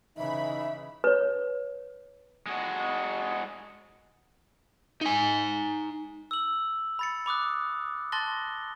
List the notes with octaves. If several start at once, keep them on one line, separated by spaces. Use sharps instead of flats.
C#3 E3 D#4 E5 B5
B4 C#5
G#3 F#4
D#4 G#5
E6 F#7
B5 A6 C#7
B5 D6 D#6 F#6
A5 C6 F#6 A6 A#6 G7